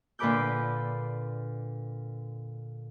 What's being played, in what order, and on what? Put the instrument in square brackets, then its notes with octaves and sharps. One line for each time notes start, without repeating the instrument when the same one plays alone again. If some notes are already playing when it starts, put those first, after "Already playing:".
[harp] A#2 D3 B4 B5 D6 G6